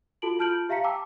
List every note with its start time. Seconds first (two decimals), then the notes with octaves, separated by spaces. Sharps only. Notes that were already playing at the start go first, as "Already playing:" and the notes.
0.22 F4 F#4 A4 A5 D7 F#7
0.39 F4 A5 F6 G6 D7 F#7
0.69 G4 E5 F5 A#5 B6 C#7
0.84 G5 A5 A#5 D6 E6